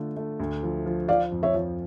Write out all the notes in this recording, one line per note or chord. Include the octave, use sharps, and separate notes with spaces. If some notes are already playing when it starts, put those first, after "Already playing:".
Already playing: D3 A3 F4
A3
D2
F3
F3
F3 D5 F5
F2
C#5 E5
F3